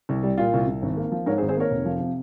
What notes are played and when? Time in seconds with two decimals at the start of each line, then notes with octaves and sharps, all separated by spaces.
0.09 C2
0.23 G3
0.38 A#2 F4
0.54 C2
0.67 C2
0.82 G#1
0.97 A#3
1.12 F3
1.26 G#2 A#4 C#5
1.38 G#4 C5
1.42 G#1
1.48 G#4 C5
1.57 A#3 A#4 C#5
1.71 F1
1.85 F3
2.00 C3